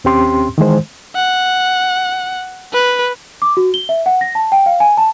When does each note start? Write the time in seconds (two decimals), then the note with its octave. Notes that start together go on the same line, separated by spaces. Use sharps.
0.04 D#2 C4 C#4 G4 C6
0.58 D#3 E3 G#3 C5
1.15 F#5
2.73 B4
3.42 D6
3.57 F#4
3.74 G7
3.89 E5
4.06 F#5
4.21 A#6
4.35 A5
4.52 G5
4.66 F5
4.80 G#5
4.97 A5